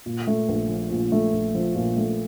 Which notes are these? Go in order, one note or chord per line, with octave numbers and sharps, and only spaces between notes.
A#2
A3
A#1
F3
A#2
A3
A#1
F3
A#2
A3